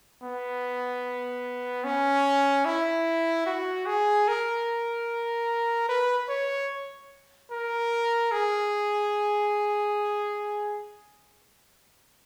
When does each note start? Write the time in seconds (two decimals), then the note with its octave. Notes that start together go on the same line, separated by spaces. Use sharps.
0.23 B3
1.84 C#4
2.65 E4
3.46 F#4
3.86 G#4
4.28 A#4
5.89 B4
6.29 C#5
7.51 A#4
8.32 G#4